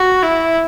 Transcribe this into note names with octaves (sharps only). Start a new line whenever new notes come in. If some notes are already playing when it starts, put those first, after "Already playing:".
Already playing: F#4
E4